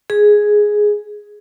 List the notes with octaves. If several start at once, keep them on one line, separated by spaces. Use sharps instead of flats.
G#4